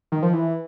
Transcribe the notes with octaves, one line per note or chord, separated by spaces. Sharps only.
D#3
F3
E3